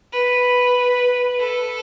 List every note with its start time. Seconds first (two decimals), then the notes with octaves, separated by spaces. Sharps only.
0.13 B4
1.40 A4